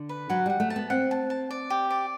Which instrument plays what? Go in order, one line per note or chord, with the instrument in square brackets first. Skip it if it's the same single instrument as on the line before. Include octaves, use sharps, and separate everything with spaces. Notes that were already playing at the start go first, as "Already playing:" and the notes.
Already playing: [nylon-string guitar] D3
[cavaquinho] B4
[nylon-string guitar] F#3 [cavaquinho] F#5
[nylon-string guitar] G3 [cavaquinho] F#5
[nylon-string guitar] A3
[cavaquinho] A5
[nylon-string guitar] B3
[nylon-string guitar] C4 [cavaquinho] F#5
[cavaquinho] A5
A5
D5
G4
D5